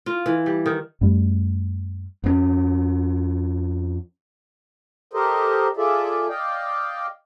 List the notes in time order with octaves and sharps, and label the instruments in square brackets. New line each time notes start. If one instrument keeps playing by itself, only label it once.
[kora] F4
E3
G3
D#3
[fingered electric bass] F#2 G3 A3
F2 B3 C#4
[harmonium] G4 A4 A#4 C5 D#5
F4 G#4 A4 D5 E5
D5 D#5 F5 G5